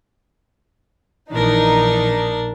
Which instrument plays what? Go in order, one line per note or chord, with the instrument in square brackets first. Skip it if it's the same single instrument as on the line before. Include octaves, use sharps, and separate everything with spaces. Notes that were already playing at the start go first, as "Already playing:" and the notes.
[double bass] A#1 [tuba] E3 [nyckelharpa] D4 A#4 [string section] D#4